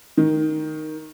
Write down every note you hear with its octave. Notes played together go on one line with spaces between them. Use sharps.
D#3